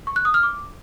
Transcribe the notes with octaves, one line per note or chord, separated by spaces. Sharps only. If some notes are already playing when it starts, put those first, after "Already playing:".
C#6
F#6
D#6
F6
D6